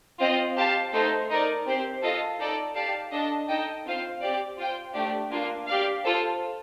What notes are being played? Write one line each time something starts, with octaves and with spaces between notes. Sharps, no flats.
C4 F4 C5 D#5
G4 C5 F5 A5
A3 D#4 A4 C5
D#4 A#4 D5
C4 G4 C5
F4 A4 D#5
D#4 A4 D5
G4 D5 F5 A5
D4 A4 D#5 A5
D#4 A4 D#5 G5
C4 F4 C5 F5
C4 G4 D5
F4 C5 G5
A3 D4 G4 D5
A#3 D4 F4
G4 D5 F5
F4 A4 C5